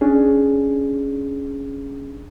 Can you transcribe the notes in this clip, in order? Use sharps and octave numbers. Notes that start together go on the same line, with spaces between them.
C#4 D4 G#4